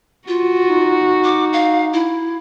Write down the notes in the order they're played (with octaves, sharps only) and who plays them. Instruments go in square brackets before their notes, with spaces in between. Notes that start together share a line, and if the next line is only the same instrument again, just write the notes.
[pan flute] F4 [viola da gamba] F#4
[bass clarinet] D#4
[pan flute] D6
F5
E4